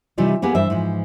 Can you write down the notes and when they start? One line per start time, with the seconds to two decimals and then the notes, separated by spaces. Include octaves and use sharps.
0.18 C3 E3 G3 D#4 F4
0.42 A#3 B3 G4 G#4 B4
0.55 G2 E3 C5 E5
0.70 G#2 E3 F3